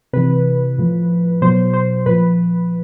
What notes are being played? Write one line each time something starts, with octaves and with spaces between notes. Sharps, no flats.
C3 E3 B4
A2 F3
B2 F#3 C5
C5
A#2 F3 B4